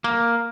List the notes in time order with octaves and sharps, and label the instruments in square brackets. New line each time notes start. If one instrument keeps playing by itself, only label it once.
[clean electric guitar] A#3